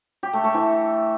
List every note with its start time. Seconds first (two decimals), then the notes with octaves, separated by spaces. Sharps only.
0.23 G4
0.33 A3
0.44 A3
0.54 E3